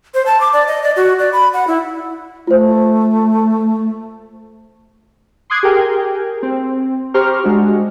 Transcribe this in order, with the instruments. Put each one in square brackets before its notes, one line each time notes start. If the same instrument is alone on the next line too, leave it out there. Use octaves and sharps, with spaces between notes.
[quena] C5
A5
D6
D5
D#5
D5
F#4
D5
B5
F#5
E4
[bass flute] A3 [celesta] F4 C5
[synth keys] C6 D6 D#6 F#6 G#6 C7
G4 G#4 A#4 G5
C4
G4 C5 A#5 C#6 F6
G#3 D4 F#4